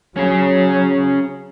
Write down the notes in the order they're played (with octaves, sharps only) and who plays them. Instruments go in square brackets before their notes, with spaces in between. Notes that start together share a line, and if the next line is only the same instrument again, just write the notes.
[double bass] F#3 [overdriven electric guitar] C#4 G#4